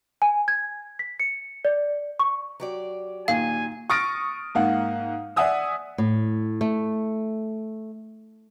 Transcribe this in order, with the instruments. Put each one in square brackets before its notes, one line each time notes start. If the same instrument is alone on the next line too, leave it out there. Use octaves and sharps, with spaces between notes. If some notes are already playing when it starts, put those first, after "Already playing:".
[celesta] G#5
G#6
B6
C#7
D5
C#6
[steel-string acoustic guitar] F#3 G4 D5
[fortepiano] A#2 D#3 [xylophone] F5 [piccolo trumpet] G#5
[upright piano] C#6 D#6 F6 A6 A#6 D7
G#2 A#3 F5 F#5
D5 E5 F#5 G#5 D#6 E6
[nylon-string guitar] A2
A3